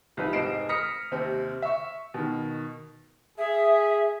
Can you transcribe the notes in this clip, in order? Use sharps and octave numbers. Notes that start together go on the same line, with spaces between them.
C2 F3 D#4 B4
F1 G#2 D#5 C7 D7 E7
D#6 F6 A#6 B6 C#7
D#2 C3 C4
E5 C#6
B2 D#3
G#4 E5